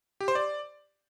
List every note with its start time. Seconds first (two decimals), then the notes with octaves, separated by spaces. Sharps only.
0.21 G4
0.28 C5
0.35 D5